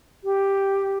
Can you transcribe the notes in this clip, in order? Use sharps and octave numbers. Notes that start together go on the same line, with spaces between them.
G4